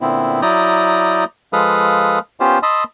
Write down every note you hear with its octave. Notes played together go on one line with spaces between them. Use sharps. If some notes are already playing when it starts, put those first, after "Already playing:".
A#2 D3 B3 C4 E4
F#3 E4 D5 A#5 D#6 G6
F3 G#3 A4 B4 F5 D#6
B3 C#4 F4 G4 C5
D#5 A5 B5 C6 D#6 E6